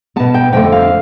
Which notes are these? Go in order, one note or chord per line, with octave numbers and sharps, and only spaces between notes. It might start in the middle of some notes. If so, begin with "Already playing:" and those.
B2 B3 A5
G5
F2 D3 A3 G5
F5